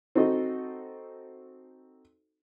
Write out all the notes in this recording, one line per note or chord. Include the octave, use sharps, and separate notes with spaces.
C4 D#4 F#4 A4 D#5